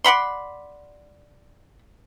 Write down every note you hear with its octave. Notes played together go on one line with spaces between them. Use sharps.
D5 F#5 B5 C6